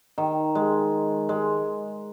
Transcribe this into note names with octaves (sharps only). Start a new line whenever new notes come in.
D#3
G#3
G#3